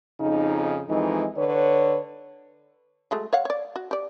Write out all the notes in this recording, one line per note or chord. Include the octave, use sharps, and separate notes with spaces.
F2 C#3 D#4
F2 E3 G#3 D#4
D3 B4 C#5
F#3 G#3 A3
C#5 F5 F#5
C#5 D5
F#4
G4 D5